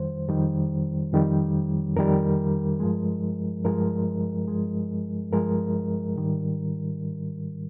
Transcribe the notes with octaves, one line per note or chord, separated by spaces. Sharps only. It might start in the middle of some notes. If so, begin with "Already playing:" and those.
Already playing: F2 D#3 G3 C5
F2 D#3 G3
F2 D#3 G3
F2 D#3 G3 A#4
G2 F3 G#3
G2 F3 G#3 A#4
G2 F3 G#3
G2 F3 G#3 A#4
G#2 D#3 G3